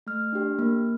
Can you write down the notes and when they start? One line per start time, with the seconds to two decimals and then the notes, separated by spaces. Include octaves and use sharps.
0.07 A3 F6
0.33 D4 G4
0.59 A#3